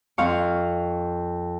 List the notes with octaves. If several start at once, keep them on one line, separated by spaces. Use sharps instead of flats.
F2 F5 C#6